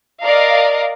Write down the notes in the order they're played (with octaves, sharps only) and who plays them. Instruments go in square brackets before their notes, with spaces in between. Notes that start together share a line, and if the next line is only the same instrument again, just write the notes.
[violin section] A#4 D5 D#5 F5